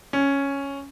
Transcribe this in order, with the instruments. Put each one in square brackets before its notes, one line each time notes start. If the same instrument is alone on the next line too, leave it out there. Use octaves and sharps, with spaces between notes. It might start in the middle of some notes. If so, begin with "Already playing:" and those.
[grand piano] C#4